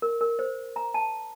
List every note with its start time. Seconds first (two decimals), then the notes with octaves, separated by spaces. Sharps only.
0.02 A#4
0.21 A#4
0.39 C5
0.76 A#5
0.94 A5